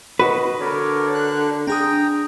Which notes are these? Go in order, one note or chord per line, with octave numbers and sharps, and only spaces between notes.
F#4 B4 D#5
D3 A#4 C#5 D5
D4 F#6
D4 G#4 G5 A#5 D#6